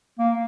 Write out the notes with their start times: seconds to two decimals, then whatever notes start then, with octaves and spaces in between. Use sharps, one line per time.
0.19 A#3